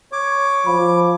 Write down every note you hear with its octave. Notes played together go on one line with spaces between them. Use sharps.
C#5 D6
F3 B5